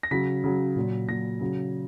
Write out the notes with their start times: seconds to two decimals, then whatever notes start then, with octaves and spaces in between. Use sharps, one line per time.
0.03 A#6
0.11 C#3 F#3 B6
0.44 C#3 F#3
0.76 A#2 F#3
1.08 A#2 F#3 A#6
1.41 C#3 F#3